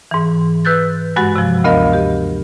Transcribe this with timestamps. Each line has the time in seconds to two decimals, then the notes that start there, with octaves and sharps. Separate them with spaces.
0.11 G#2 E3
0.65 B4 E6 F#6 G6 A6
1.16 G2 G#3 F#4 F#5 A6
1.36 C3 F3
1.64 D2 B3 A#4 D#5 F5
1.93 G4